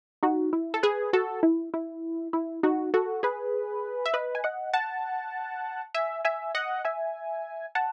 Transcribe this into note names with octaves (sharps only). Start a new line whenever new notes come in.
D#4 F#4
E4
A4
G#4 B4
F#4 A4
E4
E4
E4
D#4 F#4
F#4 A4
G#4 B4
E5
B4 D#5
G#5
D#5 F#5
F#5 A5
E5 G#5
E5 G#5
D#5 F#5
E5 G#5
F#5 A5